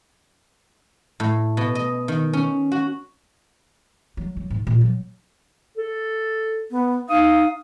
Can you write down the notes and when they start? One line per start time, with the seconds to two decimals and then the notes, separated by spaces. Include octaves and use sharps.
1.20 A2
1.57 B2
1.75 D#5
2.08 D#3
2.33 C#4
2.72 F#4
4.17 F#3
4.37 F#3
4.50 G#2
4.67 A#2
4.81 F#3
5.77 A4
6.71 B3
7.09 D#4 F5 D#6